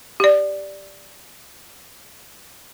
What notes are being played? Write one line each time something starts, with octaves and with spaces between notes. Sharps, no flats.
G4 D5